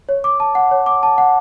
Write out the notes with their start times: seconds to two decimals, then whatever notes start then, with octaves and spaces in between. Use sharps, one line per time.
0.09 C#5
0.24 D6
0.40 A5
0.55 F#5
0.71 C#5
0.86 D6
1.03 A5
1.18 F#5